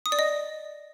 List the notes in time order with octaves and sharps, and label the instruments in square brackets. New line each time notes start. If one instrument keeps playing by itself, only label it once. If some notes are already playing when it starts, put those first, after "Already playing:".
[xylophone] D#6
D5
D#5